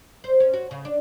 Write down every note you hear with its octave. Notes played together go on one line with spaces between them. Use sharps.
C5
C#4
F#4
C#3
D4